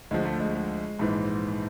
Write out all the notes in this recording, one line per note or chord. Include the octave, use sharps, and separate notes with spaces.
D2 D3 F3 G#3
A3
G#3
G#3
A#1 G#2 E3